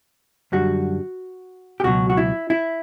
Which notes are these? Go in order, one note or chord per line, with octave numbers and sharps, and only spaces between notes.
F#2 D3 G3 F#4
G4
C#2 B2 F#3 F#4
F#4
E4
E4